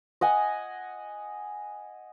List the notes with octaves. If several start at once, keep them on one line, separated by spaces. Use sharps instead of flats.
D#5 F#5 G#5